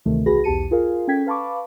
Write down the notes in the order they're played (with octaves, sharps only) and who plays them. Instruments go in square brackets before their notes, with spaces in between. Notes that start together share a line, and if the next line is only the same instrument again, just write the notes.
[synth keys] D2 C3 D#3 E3 A3
B1 F#4 G#4 B4 B5 A#6
B1 E2 G4 A5 C#7 D#7
F4 G#4 A#4 F5
C#4 A4 G5 G#6 B6
B4 F5 A5 B5 C#6 D6